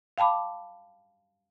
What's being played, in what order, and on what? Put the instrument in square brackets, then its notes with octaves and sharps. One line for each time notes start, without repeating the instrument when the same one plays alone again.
[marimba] F5 G5 A5 B5 D6